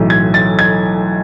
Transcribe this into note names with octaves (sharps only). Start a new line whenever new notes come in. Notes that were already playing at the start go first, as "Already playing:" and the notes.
Already playing: B1 A2 E3
G#6
A6
G#6